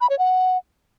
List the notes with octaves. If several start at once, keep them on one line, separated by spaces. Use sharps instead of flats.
B5
C#5
F#5